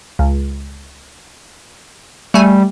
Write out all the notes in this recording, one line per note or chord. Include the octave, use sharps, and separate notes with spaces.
C#2
G3 A3 G#5